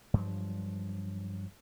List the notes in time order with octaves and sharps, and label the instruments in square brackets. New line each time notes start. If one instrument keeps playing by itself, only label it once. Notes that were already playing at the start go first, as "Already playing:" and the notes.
[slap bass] G2 F3 F#3